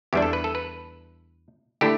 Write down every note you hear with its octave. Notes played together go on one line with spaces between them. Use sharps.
E2 E3 G3 D4 G4
A4
B4
A4
B4
D3 A3 E4 G4